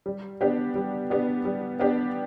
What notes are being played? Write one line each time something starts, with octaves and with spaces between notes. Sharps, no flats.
G3
B3 D4 G4
G3
B3 D4 G4
G3
B3 D4 G4